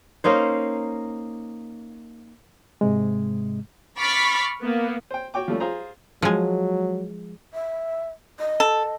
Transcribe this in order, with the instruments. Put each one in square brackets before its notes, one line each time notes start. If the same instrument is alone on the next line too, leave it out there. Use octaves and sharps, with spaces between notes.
[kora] A#3 C#4 D#4 C5
[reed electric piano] G#2 C3 G#3
[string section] B5 C#6 D6 F6 A6 B6
A#3 B3
[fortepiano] C5 G5
F#4 C#5 G5 D6
F3 G3 A3 C#4
F4 G#4 C5 A#5
[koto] F3 G#3 [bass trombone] F#3
[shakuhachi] E5
D#5
[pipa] A4